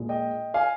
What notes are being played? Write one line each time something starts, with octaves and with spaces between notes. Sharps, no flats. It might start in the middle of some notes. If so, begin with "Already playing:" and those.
Already playing: A#1 A#2 G#3
D#5 G5
F5 G#5